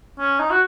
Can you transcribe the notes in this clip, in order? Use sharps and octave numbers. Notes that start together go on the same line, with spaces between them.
C#4
D#4
F#4